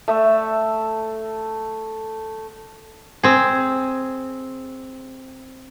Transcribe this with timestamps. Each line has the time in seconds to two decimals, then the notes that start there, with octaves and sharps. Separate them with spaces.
0.08 A3 E5
3.23 C4 G#4